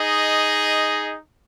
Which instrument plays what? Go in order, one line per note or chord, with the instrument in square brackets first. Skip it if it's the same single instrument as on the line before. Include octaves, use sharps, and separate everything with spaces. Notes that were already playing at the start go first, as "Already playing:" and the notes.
Already playing: [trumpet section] D#4 G#4 D#5